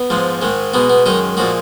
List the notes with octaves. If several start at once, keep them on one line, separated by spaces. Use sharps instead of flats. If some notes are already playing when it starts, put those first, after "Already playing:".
Already playing: B3
G#2 F3 G#3
G#2 D#3 G#3
B2 G#3 B3
B3
F#2 D#3 G#3 D#4
A#2 F3 G#3 F#4